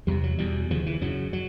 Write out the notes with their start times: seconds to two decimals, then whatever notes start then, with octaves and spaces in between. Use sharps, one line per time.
0.07 E2 C3 G3
0.23 F#3
0.38 E2 B2 G3
0.70 D#2 C#3 F3
0.86 E3
1.01 F#2 C#3 F#3
1.33 F#3